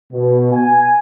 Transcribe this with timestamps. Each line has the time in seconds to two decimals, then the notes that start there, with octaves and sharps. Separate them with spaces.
0.12 B2
0.53 G#5